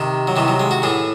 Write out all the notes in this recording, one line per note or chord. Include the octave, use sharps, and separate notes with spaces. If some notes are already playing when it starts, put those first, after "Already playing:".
Already playing: C3 D#3
F#3
C3 D#3 E3
F#3
G#3
F#4
A2 E3 G#4